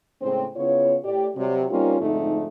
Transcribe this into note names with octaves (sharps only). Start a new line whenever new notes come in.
A2 C#3 G#3 C4
C#3 B3 E4 F4 C#5
A2 G4 D5
C3 F#3 G3
G3 A#3 C4 C#4 D#4 F4
F2 G#2 D3 A3 C4 D#4